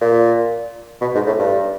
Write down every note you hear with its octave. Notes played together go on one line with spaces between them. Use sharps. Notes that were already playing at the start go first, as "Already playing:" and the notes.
A#2
B2
G#2
A2
G2